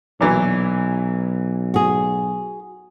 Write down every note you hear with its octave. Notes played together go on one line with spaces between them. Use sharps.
B1 A#2 E3 F#3
F#4 G#4